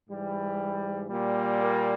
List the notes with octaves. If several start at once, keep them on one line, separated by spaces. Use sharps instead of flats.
G#2 E3 G3
A#2 G3
A#3